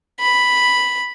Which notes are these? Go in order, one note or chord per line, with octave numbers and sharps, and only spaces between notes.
B5